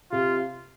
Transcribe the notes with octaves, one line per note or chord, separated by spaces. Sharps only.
C3 F4